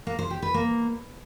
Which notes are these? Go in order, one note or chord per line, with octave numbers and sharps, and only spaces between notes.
A#3
C5
G4
B4
A#3